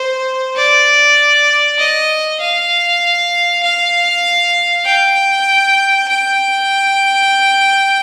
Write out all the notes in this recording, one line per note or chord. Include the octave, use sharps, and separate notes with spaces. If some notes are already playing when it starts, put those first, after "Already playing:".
Already playing: C5
D5
D#5
F5
F5
G5
G5